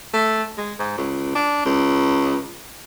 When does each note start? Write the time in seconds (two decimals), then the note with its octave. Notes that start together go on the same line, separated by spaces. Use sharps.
0.13 A3
0.58 G#3
0.79 G#2
0.97 C#2
1.35 D4
1.65 C#2